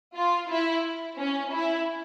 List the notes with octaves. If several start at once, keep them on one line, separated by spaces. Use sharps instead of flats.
F4
E4
C#4
E4